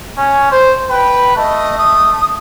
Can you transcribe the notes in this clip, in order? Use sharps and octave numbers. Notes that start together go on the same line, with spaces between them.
C#4
C5
B4 G5
A3 D#5
D#6